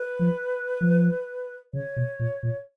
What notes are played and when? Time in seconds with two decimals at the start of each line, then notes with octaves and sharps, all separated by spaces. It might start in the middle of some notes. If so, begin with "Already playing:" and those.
Already playing: B4
0.19 F3
0.81 F3
1.73 C#3 C#5
1.96 B2
2.19 A#2
2.43 A#2